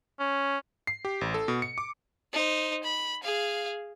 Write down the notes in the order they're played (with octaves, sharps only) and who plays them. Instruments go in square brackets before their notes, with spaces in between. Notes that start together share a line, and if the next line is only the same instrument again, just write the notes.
[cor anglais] C#4
[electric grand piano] C7
G4
A1
A4
B2
C#7
D6
[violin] D#4 C5
B5
G#4 F5